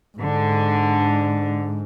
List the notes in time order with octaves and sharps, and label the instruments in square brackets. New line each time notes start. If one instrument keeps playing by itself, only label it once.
[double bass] G#2 [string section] D3